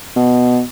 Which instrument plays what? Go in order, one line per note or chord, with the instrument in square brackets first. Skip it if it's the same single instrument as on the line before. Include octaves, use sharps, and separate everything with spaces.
[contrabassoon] B2